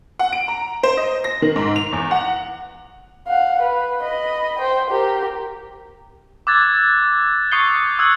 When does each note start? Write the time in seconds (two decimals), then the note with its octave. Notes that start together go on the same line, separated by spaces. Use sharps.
0.19 F#5
0.32 D7
0.48 A#5
0.83 C5
0.97 D#5
1.24 A#6
1.42 D#3
1.56 G#2
1.76 F7
1.92 E2
2.11 F#5
3.27 F5 F#5
3.62 B4
4.03 D#5 B5
4.59 C5 G5
4.90 G4 A#4
6.47 D6 E6 F#6 G#6 A6
7.52 C#6 D#6 G6 C7 C#7 G7
7.99 C#6 D#6 E6 F#6 G#6 F#7